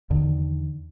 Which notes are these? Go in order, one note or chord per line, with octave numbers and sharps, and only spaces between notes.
E2 D3 D#3